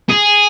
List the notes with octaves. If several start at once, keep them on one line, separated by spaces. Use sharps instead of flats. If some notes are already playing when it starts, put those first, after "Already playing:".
G#4